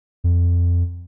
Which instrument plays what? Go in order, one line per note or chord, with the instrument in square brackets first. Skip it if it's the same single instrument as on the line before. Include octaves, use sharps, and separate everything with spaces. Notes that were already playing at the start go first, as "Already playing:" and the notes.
[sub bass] F2